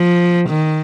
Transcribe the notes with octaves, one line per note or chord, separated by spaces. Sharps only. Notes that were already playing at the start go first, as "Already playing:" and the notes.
Already playing: F3
D#3